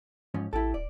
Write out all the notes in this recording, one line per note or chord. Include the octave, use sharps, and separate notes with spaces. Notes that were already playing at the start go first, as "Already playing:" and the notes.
G#2 F3 C#4
A1 E4 G4 A4
D1 D5